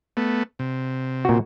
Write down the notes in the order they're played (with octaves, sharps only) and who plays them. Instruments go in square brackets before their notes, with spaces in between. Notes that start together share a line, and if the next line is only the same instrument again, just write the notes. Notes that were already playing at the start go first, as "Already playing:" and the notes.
[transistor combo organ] A3 B3
C3
[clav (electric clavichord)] A#2 F#4